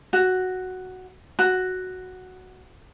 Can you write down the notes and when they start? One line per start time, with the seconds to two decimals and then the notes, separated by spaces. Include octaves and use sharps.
0.13 F#4
1.39 F#4